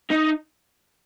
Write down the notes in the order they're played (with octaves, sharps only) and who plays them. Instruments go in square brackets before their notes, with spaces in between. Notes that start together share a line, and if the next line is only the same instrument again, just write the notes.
[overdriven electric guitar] D#4